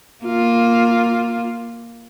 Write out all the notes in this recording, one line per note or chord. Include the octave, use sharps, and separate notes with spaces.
A#3 F4